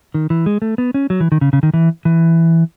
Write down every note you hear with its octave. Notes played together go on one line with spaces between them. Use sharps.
D#3
E3
G#3
A3
B3
C#4
F#3
E3
D#3
C#3
C#3
D#3
E3
E3